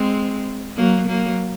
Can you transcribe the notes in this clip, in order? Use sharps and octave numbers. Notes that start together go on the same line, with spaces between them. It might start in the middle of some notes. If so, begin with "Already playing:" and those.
Already playing: G#3 C4
F#3 A#3
F#3 A#3